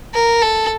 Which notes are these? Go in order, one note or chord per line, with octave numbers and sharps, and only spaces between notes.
A#4
A4